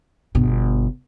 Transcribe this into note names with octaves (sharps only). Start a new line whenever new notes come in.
G1 B2